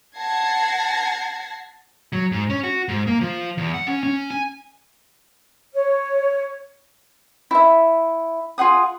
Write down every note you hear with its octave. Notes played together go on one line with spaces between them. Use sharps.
F#5 A5 G#6 A#6 C7
F#3
G#2
C#4
F#4
G#2
A#3
F3
E2
F#5
C#4
C#4
G#5
C#5
E4 E5
F4 G#4 F#5 D#6